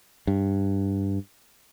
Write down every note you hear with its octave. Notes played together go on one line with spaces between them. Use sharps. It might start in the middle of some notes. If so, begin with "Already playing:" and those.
G2